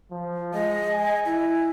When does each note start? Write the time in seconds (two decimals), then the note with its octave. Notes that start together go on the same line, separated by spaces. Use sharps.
0.11 F3
0.54 G#3 D#5
0.91 G#5
1.26 E4